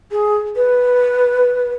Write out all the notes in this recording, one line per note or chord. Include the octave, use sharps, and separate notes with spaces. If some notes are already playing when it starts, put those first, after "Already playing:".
G#4
B4